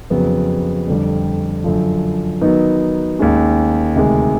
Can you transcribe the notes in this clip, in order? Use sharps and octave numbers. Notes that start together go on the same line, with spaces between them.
F2 C#3 F#3 B3
F2 D3 G3
F#2 D3 F3
D#3 F#3 B3 D#4
D#2 D#3 G#3 C#4
D2 C3 D#3 G#3